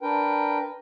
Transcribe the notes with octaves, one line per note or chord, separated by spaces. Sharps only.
D4 A#4 B4 G5